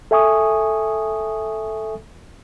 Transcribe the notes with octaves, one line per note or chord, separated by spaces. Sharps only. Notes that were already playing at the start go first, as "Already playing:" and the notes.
A4 E5 G#5 C#6 D#6